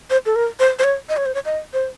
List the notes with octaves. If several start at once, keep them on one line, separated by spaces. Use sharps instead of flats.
C5
A4
A#4
C5
C5
C#5
D#5
C#5
C5
C#5
D#5
C5